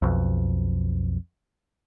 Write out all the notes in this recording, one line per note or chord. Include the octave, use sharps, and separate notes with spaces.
B1 F2